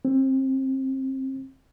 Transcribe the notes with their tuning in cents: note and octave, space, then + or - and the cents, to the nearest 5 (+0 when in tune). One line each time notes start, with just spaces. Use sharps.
C4 +25